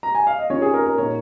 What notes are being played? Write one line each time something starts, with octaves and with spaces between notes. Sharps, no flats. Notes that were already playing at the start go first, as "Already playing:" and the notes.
A#5
G#5
F5
D#5
D#3 C#4 F4 C#5
G#4
A#4
A#4
A#2 A#3 D#4 C#5